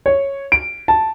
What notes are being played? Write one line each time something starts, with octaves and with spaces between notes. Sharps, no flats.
C#5
D7
A5